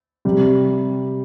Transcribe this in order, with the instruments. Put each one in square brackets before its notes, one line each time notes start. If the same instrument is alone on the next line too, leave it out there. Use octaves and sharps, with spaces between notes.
[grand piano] C3 G3